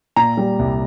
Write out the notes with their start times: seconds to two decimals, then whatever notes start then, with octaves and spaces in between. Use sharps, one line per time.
0.16 A#2 A#5
0.37 G3
0.59 C2